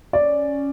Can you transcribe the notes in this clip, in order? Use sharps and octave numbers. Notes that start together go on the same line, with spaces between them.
C#4 D5